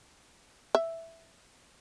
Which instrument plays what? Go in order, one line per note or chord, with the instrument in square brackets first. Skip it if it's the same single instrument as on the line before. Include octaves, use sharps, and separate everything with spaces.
[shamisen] E5